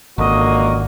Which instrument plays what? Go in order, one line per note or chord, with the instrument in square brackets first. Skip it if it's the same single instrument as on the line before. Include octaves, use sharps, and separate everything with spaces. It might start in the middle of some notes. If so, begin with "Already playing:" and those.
[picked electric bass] G#1 [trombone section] C#2 D3 A#3 [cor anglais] F#4 [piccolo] D#5